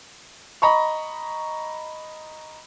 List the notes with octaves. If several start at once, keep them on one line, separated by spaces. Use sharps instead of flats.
D#5 A#5 B5 C#6